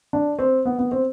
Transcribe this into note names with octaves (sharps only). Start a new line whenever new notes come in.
D4
C4
B3
B3
C4